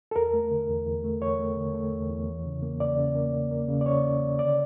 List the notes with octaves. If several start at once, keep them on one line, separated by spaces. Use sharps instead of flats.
A4
E2 A#4
A3
D3
E2
E2
A3
E2 C#5
A3
D3
A3
E2
E2
E3
C#3
A#3
C#3 D5
C#3
A#3
C#3
A#3
C#3
D5
C#3 C#5
C#3
C#3
D3 D5